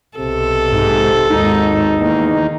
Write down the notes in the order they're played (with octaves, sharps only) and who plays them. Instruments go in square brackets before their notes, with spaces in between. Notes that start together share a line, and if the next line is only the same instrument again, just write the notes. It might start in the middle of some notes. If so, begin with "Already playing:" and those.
[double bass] B1 [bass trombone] C3 [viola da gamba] A4
[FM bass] G#2
[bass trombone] G#1 [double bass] D#2 G#2 [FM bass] D#4
[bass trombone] E2 [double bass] D#3 A#3